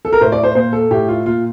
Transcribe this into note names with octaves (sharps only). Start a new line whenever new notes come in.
A4
A#4
A2 C5
D5
C5
A#2 C5
A4
A2 G4
F4
A#2 F4